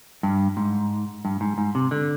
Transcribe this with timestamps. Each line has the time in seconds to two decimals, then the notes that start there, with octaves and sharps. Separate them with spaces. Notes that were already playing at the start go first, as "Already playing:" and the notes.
0.23 G2
0.57 G#2
1.25 G2
1.41 G#2
1.58 G#2
1.75 C3
1.91 D3